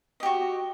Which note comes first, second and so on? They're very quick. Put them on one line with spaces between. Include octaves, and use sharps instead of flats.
D#5 G4 F#4